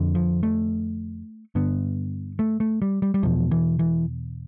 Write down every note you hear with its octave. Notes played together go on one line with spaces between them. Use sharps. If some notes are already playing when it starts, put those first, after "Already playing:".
Already playing: F2 D3
F3
A3
G2 D3 B3
A3
A3
G3
G3
G3
E2 B2 F3
E3
E3